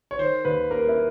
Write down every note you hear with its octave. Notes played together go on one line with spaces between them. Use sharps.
C#5
D#3 C5
D#2 B4
A#3 A#4
E4